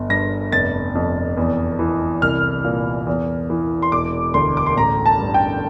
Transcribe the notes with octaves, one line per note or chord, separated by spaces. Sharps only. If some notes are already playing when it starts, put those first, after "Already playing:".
Already playing: G1
G2 A#6
F1 A6
F2
E2
E3
C2 F6
A#2
E2
E3
C6
E1 D6
D2 C6
D6
C6
A1 A#5
A5
G2
G5